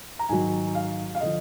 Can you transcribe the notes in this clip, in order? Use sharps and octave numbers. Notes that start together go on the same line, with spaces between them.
A#5
G#2 D#3 F#3 G#5
F5
F5
D3 F3 D#5